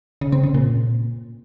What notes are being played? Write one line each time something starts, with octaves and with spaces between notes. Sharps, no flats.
C#3
C4
C#3
A#2